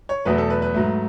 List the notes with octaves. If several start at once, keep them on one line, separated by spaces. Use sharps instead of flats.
C#5
E2 B2 F#3 A3 B4
A4
B4
B4
G#2 F#3 A3